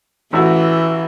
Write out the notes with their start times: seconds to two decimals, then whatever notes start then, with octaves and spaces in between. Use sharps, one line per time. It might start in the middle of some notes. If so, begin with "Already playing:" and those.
0.33 A1 E3 F#4